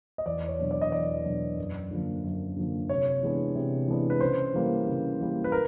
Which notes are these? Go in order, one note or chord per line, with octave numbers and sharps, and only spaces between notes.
D#5
E2 D5
C#5
B2 F#3 B3 D4
D5
D#5
E2 D5
B2 F#3 B3 D4
F#2
D3 F3 A#3
F#2
D3 F3 A#3
C3 C#5
E3 G#3 B3 D4
C3
E3 G#3 B3 D4
B4
C#3 C5
E3 G3 A#3
C#3
E3 G3 A#3
B4
A#4